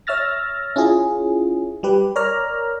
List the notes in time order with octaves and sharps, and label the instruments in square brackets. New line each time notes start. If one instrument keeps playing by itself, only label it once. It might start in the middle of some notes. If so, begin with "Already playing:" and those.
[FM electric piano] C#5 E5 E6 F6 A6 A#6
C#4 E4 F4 G#4
G3 G4 B4
A#4 C#5 D5 A#5 F6